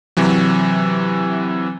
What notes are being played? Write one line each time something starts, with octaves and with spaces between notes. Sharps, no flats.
C3 E3 F#3